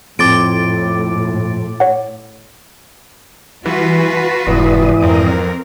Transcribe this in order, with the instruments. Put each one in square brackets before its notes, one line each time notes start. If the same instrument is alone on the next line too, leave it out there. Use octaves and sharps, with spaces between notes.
[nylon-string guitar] F2 [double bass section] A2 [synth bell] D6 A6 D7
[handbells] C#5 F#5
[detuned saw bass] E3 [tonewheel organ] G3 [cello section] F4 F#4 B4
[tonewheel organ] A5
[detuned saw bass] F1 [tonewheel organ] G#2 D5 D#6 [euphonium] E3
[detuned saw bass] F2 [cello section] C4 A#4